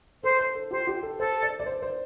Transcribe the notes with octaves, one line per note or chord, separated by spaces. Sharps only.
A4 C5
C5
A4
G4 C5
G4
A4
A4 C5
D5
D5
C5
C5